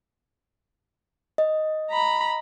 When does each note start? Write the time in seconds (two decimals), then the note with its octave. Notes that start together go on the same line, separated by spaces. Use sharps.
1.38 D#5
1.90 A#5 B5